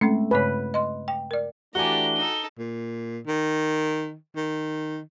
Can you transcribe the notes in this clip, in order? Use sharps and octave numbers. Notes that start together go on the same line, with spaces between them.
G#3 A3 C4 C#4
G2 C#3 B4 C#5
D#5 C6
G5
A#4 D5
E3 A3 D4 F#4 G4 G#5 A#5 G7
D#4 A4
A#2
D#3
D#3